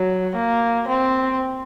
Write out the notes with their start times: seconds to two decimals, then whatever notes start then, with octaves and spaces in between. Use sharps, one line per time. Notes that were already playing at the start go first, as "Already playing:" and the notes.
Already playing: F#3
0.36 A#3
0.88 C4